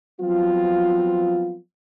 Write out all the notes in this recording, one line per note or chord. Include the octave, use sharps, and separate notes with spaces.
F3 F#3 B3 C4 F4